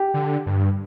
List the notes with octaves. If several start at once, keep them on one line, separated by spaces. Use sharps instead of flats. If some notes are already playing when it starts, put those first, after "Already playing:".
Already playing: G4
D3
G2